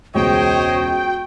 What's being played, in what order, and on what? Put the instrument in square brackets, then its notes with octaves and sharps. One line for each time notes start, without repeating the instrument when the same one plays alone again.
[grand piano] E1 C#2 G#3 [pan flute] F#4 [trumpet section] C5 C#5 D#5 [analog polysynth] G5